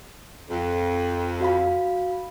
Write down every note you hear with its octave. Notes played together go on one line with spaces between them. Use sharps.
F2
F#4 F5 B5